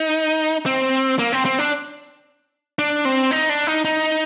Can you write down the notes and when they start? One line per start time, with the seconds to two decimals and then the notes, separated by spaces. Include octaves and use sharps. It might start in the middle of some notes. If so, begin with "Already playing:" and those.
Already playing: D#4
0.66 C4
1.19 A#3
1.32 C4
1.45 C4
1.59 D4
2.79 D4
3.05 C4
3.31 D#4
3.50 D4
3.67 D#4
3.85 D#4